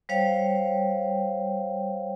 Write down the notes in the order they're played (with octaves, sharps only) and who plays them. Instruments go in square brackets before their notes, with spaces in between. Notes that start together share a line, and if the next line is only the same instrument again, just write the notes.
[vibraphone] G3 C5 C#5 F5 G5